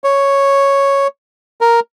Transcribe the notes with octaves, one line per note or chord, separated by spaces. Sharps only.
C#5
A#4